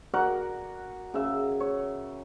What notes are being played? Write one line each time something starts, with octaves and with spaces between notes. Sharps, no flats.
F#4 A#4 D5 F#5
C#3 E5
C#5